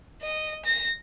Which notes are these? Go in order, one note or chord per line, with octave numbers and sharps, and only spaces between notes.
D#5
A#6